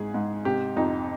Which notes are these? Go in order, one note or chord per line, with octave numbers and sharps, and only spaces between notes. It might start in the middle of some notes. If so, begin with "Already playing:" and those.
Already playing: G#2 G#4
G#2
C3 G4
F2 D#4